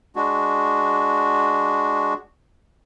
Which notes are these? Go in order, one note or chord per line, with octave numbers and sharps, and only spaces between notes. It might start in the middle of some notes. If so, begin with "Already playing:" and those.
G#3 D4 F#4